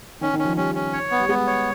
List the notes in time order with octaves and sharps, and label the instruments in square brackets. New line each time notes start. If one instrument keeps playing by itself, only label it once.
[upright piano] D#3 [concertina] C#4
[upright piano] D#3
[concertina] C#4
[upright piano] F3
[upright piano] G3 [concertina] C#4
[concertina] C#4
C#5
B3
[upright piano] G3
[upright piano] G#3 [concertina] B3
[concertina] C#5